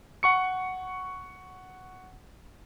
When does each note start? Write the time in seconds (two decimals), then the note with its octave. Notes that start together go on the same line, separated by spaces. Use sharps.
0.23 F#5 C#6 C#7